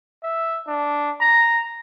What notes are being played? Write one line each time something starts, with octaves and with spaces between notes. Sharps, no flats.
E5
D4
A#5